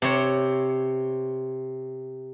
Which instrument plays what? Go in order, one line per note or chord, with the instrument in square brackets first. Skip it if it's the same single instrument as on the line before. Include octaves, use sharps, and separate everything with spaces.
[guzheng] C3 C4 C#5